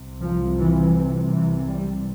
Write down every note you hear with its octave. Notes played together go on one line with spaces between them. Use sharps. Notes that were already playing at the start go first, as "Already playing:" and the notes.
Already playing: C2 C3
F3
E3
E3
G3